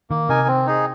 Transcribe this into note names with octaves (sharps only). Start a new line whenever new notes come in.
D#3 A#3
C3 D#4 A#4 G#5
C4
D#4 G#4